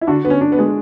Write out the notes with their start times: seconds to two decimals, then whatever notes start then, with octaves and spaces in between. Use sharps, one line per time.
0.01 E4
0.07 D3 D4 F#4
0.24 D3 B3
0.30 C#4
0.41 D4
0.52 B3
0.59 G#3